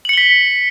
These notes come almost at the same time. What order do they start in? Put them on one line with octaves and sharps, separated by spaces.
F#7 C#7 G7 B6